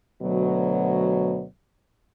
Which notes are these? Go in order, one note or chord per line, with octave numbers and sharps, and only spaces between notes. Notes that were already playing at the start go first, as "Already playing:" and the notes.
D2 B2 F#3